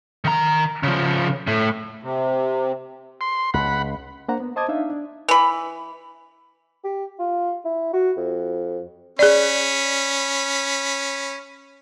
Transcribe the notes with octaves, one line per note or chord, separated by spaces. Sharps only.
D#3 A#5
C#3 F3
A2
C3
C6
C#2 F#5 B5
A#3 D4 C5 F#5 A#5
B3
C5 D#5 A5 D6 D#6 G#6
D4 D#4 E5 F5
D4
E3 B5
G4
F4
E4
F#4
F2
C#4 G#4 D5 B5